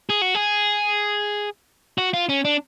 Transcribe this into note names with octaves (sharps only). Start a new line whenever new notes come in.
G#4
F#4
G#4
F#4
F4
C#4
D4